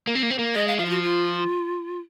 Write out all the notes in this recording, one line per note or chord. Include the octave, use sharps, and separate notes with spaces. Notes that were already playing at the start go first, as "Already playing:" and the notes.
A#3
C4
A#3
C4
A#3
G#3 D#5
F5
F3 F5
F4
F#4
F4